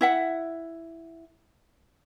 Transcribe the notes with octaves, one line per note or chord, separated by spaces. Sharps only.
E4 E5 F#5